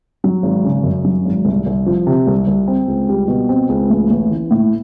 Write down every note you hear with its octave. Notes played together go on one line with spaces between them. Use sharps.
F#3
G#1
C#3
F#2
F#3
G#1
C2
C2
F3
C3
C2
C2
C4
C#2
G3
B2
C4
C#2
A1
A1
E3
A2